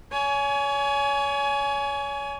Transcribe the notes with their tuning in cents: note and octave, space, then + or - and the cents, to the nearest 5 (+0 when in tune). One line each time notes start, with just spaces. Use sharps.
C#5 +35 G#5 +15